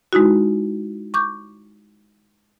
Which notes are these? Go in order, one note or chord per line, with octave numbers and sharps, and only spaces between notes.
G#3 D#4 E4 F#4
C#6 D6 G6